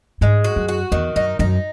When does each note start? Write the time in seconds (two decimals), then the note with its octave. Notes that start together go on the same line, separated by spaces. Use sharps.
0.21 G#2 G#3
0.44 F#4
0.56 F#2
0.68 F#4
0.92 E2 D#3
1.16 F#2 D#4
1.39 F#2 D#4